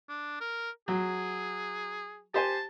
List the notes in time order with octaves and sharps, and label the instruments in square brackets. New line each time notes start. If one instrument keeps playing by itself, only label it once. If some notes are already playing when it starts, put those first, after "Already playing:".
[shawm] D4
A#4
[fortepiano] F#3 [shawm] G#4
[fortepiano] G4 C5 G#5 [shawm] A5